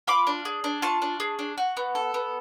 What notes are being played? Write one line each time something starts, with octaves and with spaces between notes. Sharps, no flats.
F4 B5 D6
D4
G#4
D4
F4 A5 C#6
D4
G#4
D4
F#4
B3
A4
B3